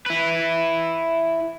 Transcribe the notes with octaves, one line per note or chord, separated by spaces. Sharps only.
E4 B4